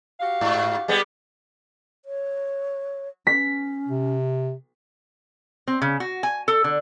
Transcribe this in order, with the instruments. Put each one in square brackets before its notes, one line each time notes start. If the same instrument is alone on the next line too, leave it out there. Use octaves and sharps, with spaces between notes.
[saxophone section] F#4 G4 F5
[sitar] G#2
G3 G#3 B3
[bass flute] C#5
[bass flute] C#4 [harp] B6
[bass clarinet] C3
[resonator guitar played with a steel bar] C4
C#3
F#4
G#5
A4
D3